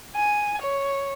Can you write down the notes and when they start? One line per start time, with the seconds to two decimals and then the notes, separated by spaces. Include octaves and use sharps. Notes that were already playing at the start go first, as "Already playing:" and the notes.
0.16 G#5
0.62 C#5